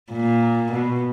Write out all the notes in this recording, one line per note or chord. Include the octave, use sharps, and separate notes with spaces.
A#2
B2